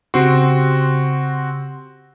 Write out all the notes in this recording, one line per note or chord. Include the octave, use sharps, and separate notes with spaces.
C#3 C4 F#4 G4 C6